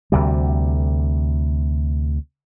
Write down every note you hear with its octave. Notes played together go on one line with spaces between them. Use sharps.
D2 C3 G3